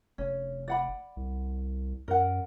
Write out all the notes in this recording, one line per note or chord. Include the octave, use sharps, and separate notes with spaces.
F1 C#4
D5 F#5 B5
C2
F#2 A#4 F#5